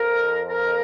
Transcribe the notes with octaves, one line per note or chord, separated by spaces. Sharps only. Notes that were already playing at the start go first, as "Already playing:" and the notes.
Already playing: F2 F3 A#4
A#4